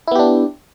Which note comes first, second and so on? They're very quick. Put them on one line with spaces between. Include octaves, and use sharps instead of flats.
E4 B3 G4 D4